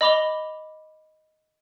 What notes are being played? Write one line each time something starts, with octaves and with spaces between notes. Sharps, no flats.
D#5 B5 D6 F7 G7